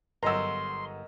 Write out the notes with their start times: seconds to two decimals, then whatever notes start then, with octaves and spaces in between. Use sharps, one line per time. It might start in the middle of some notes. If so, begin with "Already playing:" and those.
0.23 G1 F#2 A#4 D#5 A#5 C6 E6